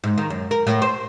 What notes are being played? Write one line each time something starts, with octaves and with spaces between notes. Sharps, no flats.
G#2
D#3
F#2
A#4
A2
C5